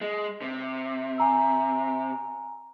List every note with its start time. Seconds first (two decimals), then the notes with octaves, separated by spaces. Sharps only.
0.01 G#3
0.41 C3
1.18 G#5 A#5 E6